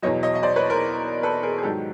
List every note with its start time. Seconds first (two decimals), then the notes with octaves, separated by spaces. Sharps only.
0.02 E2 B2 F#3 C#5 D#5
0.23 C#5 D#5
0.35 D#5
0.43 C5 D5
0.56 B4 C#5
0.70 A#4 C5
1.23 A4 B4
1.43 G#4 A#4
1.58 G#4
1.63 G#2 D#3 F#3 G4 A4